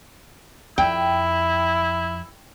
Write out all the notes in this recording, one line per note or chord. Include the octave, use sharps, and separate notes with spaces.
F2 E4 G5